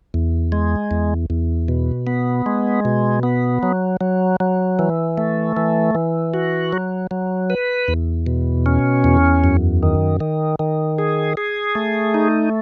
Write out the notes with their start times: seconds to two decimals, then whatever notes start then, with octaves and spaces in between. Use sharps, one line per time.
0.14 E2
0.52 G#3
0.91 E2
1.30 E2
1.68 B2
2.07 B3
2.46 G#3
2.85 B2
3.23 B3
3.63 F#3
4.01 F#3
4.40 F#3
4.79 E3
5.18 A3
5.57 E3
5.95 E3
6.34 F#4
6.73 F#3
7.11 F#3
7.50 B4
7.88 E2
8.27 B2
8.66 C#4
9.04 E2
9.44 F#2
9.83 D#3
10.20 D#3
10.59 D#3
10.98 G#4
11.37 G#4
11.75 A3
12.14 D#4